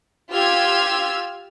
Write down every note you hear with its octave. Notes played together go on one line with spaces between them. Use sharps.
F4 G4 E6 F6 G#6